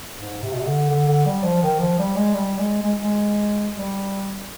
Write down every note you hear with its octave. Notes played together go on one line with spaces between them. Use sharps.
G#2
C3
B2
C3
D3
D3
D3
G3
F3
D#3
F3
G3
G#3
G3
G#3
G#3
G#3
G3